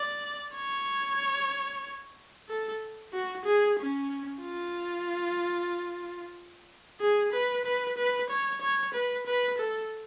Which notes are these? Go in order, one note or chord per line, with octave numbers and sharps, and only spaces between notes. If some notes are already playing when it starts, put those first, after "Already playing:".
Already playing: D5
C#5
A4
F#4
G#4
C#4
F4
G#4
B4
B4
B4
C#5
C#5
B4
B4
A4